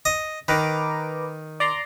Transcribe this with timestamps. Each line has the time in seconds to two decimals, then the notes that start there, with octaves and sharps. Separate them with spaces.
0.05 D#5
0.48 D#3 B4 A#5 D6
1.60 D5 A#5 C6